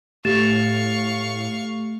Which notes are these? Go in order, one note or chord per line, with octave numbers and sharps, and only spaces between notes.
A2 A3 G4 F5 C#6 A6 E7